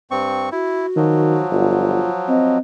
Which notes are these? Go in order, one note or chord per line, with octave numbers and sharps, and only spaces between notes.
G2 C4 C#6
E4 F#4
D#3 F3 F#3
G1 F4
C4 D#5